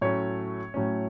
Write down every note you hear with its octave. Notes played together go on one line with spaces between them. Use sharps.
A2 F#3 A3 C#4 C#5
A2 F#3 A3 C#4